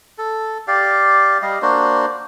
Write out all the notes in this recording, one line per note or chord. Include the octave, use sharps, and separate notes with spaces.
A4
G4 D5 F5
G3 D#5 F5
A#3 D4 F#4 C5